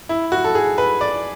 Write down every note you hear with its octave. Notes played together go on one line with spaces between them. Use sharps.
E4
F#4
A4
G#4
B4
D5